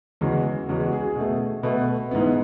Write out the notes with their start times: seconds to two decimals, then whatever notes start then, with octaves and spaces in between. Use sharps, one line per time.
0.21 E2 C#3 G#3 F#4
0.68 E2 C#3 G#3 F#4
0.86 F#4
0.93 G#4
1.16 B2 A3
1.63 B2 A3 B4
2.11 G#2 E3 B3